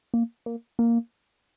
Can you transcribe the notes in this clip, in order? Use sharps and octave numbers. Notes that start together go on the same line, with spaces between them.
A#3
A#3
A#3